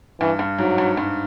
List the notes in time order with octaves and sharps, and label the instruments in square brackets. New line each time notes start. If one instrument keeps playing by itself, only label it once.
[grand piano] G2 [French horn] E3
[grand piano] G2
[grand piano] G#2 [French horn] F#3
[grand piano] G2
G2